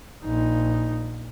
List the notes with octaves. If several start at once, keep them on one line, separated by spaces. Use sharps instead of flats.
A#1 D#4